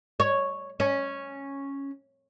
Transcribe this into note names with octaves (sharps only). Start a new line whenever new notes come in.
C#5
C#4